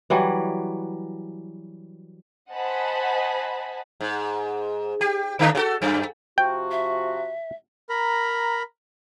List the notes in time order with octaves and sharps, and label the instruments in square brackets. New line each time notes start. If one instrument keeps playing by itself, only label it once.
[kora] E3 F#3 G3
[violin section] C5 D#5 F#5 G#5 A5 B5
[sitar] G#2
G4
D3 A3 D4
C#3 F#4 A4
F#2
[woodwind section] C3 F3 F#4 [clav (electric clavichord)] G5
[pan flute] E5
[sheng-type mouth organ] A#4 A#5 B5